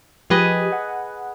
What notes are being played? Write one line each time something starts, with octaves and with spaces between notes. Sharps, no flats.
F3 G4 G#4 B4 D#5
F#5